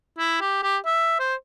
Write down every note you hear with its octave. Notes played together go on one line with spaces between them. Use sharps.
E4
G4
G4
E5
C5